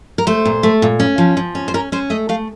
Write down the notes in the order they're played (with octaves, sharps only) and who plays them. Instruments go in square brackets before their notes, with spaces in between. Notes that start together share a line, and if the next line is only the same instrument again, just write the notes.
[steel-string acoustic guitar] A#4
A3 C5
A#2
A3
A#2
C#4
F3
F3
C#4
C5
C#4 A#4
C#4 C5
A3 D#5
A3 F5